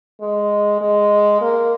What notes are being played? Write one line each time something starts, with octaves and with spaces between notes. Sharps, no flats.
G#3
G#3
A#3